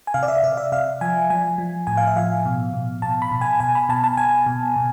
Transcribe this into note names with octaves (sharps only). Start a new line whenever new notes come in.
G#5
C3 F5
D5
E5
C3 D5
E5
C3 F5
F3 G#5
F3 G#5
F3
A2 G#5
F5
E5
F3 F5
B2
B2
B2 A5
B5
B2
G#5
B2 G#5
B5
B2 A5
A5
B2 G#5
B2
B2